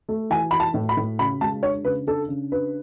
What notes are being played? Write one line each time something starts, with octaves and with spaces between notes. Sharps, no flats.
A3
E3 G#5
E3 B5
A5
A2
B5
A2
C#3 B5
G#3 A5
D4 C#5
C#3 B4
D4 A4
C#3
D4 B4